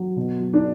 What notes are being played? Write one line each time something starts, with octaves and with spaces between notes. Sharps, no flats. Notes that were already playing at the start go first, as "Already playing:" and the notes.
Already playing: F#3
B2
F#3
D4